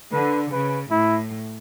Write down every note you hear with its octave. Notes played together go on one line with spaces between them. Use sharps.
D3 B4
C#3 B4
A2 E4